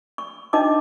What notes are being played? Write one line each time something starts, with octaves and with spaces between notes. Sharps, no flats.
C#6
D4 D#4 D#5 A5 D6